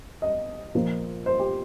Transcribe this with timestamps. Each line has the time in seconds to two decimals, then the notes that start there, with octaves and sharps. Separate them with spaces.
0.22 D#5
0.75 A#2 F3 A#3
1.26 C5
1.40 G4